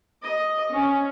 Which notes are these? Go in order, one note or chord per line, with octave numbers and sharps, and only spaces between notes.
D#5
C#4